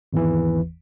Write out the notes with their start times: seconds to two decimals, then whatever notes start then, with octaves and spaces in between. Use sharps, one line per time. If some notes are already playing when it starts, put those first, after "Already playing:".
0.13 G#1 E2 E3